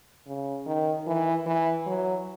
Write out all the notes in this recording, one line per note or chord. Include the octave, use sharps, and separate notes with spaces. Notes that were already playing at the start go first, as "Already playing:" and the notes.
C#3
D#3
E3
E3
F#3